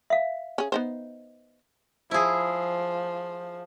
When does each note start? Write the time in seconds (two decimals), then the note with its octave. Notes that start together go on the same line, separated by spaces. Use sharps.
0.10 E5 F5
0.58 C#4 G#4
0.72 B3 D#4 C5
2.11 F3 E4 G#4